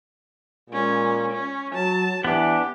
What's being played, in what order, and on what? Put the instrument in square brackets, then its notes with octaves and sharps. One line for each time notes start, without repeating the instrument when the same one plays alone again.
[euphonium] A#2 [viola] G#3 C#4
[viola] C#4
[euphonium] F#3 [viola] A5
[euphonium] E3 [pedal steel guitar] B3 D4 [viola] G4